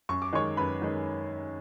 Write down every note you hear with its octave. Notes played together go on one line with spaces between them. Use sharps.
F#2 C#6
D6
D#3 G#3 C#5 C#6
F#2 B4 B5
D#3 G#3